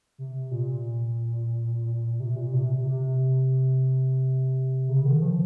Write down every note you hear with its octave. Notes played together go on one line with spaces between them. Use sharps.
C3
A#2
C3
A#2
C3
C3
C3
C#3
D#3
F3